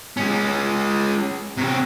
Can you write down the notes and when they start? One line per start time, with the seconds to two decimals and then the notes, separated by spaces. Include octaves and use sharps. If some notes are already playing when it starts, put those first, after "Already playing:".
0.17 G#3 C#4
1.57 C3 C#5